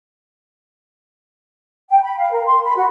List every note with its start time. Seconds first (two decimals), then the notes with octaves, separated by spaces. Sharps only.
1.91 G5
2.03 B5
2.18 F5
2.31 A#4
2.46 C6
2.65 B5
2.77 F#4